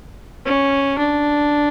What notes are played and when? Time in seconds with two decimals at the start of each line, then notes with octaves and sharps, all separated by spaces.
0.45 C#4
0.99 D4